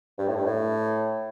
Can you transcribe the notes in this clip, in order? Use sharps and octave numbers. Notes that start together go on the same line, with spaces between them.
G2
A2
G2
A2